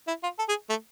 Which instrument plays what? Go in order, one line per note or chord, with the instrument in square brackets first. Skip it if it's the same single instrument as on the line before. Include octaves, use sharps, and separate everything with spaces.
[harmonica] E4
F4
A4
G#4
A3